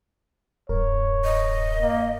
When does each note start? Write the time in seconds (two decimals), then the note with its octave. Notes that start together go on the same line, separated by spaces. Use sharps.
0.69 D1 F#2 A#4 C#5
1.24 D#5
1.81 A#3